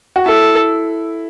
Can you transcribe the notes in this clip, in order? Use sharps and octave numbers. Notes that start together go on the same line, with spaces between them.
F#4
E4 A4